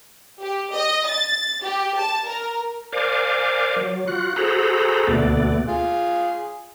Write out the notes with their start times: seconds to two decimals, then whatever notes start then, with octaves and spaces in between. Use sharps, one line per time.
0.41 G4
0.73 D#5
1.07 A6
1.63 G4
1.96 A5
2.27 A#4
2.92 A#4 C5 D5 F5 G#5 D6
3.76 F#3
4.07 F4 F#4 F#6
4.36 F#4 G#4 A4 C5 A#5 B5
5.07 D2 B2 A3 B3 D5
5.68 F4 G#4